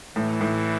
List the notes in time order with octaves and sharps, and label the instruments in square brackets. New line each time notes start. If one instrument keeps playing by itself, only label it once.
[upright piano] A2 [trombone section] E3
[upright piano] A2